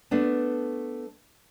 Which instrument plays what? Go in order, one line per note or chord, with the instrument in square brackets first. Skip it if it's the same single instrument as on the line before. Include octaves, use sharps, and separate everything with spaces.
[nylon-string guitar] A3 B3 D4